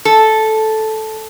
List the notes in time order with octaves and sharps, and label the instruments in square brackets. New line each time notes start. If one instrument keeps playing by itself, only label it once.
[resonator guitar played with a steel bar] A4